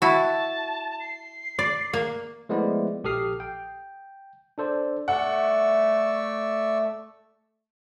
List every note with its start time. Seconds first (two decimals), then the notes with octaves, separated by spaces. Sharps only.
0.02 E4 F#4 A5
1.00 C7
1.59 D5
1.93 A#3
2.49 F3 G#3 A3 B3 E4 D5
3.04 A#1 G4 A4 D#6 F6 C7
3.40 G5
4.58 D4 A4 C5 D5
5.08 A3 D5 F#5 C#6 E6